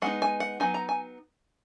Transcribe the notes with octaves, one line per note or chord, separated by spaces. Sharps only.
G#3 B3 D#4 F#5
G#5
F#5
F#3 B3 D#4 G#5
A#5
G#5